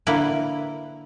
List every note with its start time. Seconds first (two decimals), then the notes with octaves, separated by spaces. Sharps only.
0.07 D3 A#3 E4 B4